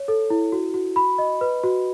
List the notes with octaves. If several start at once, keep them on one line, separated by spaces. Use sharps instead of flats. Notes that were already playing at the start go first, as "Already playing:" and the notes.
Already playing: C#5
A4
E4
F#4
F#4
B5
D#5
B4
F#4